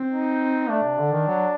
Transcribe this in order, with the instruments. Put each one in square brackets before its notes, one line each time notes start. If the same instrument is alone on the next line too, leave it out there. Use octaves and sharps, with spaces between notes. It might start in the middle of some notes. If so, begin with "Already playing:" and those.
Already playing: [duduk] C4
[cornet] D#4
[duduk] A3 [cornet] D4
[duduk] C3
D3
D#3
F#3